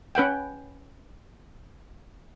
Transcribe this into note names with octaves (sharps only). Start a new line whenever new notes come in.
C#4 B4 F#5 G5